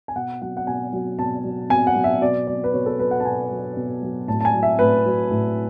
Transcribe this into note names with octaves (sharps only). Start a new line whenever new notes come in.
G#5
B2 F#5
F#3 F#5
F#5
B2 G#5
F#3
B2 A5
F#3
B2 G#5
F#5
F#3
E5
B2 D5
F#3 D5
B4
B2 C#5
A4
F#3 B4
F#5
A5
B2 G#5
F#3
B2
F#3
A2 A5
A5
G#5
F#3
E5
A2 B4
F#3
A2